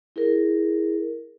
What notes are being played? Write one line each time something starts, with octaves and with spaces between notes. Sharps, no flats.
E4 G#4 A#4